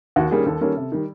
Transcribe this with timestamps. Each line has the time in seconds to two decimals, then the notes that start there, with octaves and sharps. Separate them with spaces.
0.16 D#2 F#4
0.31 D#3 G3 A#3 C#4 G#4
0.46 D#2 A4
0.61 D#3 G3 A#3 C#4
0.77 C3
0.92 D#3 G3